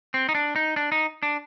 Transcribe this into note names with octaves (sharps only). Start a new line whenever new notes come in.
C4
D#4
D4
D#4
D4
D#4
D4